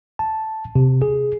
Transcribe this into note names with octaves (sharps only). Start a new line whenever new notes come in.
A5
C3
G#4